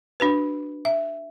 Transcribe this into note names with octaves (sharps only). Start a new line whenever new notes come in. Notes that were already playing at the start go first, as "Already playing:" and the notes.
D4 F#4 B4
E5